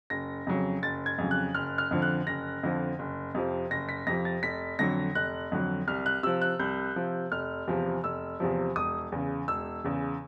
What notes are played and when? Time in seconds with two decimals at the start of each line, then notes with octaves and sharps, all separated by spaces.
0.10 F#1 A#6
0.47 F2 C#3 F#3
0.82 F#1 A6
1.06 G#6
1.18 F2 C#3 F#3
1.31 F#6
1.55 F#1 F6
1.78 F6
1.91 F2 D3 F3
2.02 F#6
2.27 F#1 A#6
2.63 F2 D3 F3
2.99 F#1
3.35 F2 C3 F3
3.71 F#1 A#6
3.89 B6
4.07 F2 A#6
4.09 C3 F3
4.25 A6
4.43 F1 B6
4.79 F2 D3 F#3 A#6
5.15 F1 F#6
5.52 F2 D3 F#3
5.87 C2 F6
6.06 F#6
6.23 C3 E6
6.27 F3
6.42 F#6
6.59 C2 G6
6.96 C3 F3
7.32 F1 F6
7.68 E2 C3 F3
8.04 F1 E6
8.40 E2 C3 F3
8.76 E1 D#6
9.12 E2 C#3
9.48 E1 E6
9.84 E2 C#3